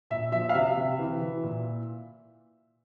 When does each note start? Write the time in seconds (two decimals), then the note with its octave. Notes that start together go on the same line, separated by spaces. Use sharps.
0.10 A#2 E5
0.32 F3 E5
0.49 F5
0.54 C3 E5
0.77 C3
0.99 E3
1.21 E3
1.43 A#2